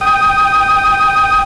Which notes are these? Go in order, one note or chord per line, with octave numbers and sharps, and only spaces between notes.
G5 D#6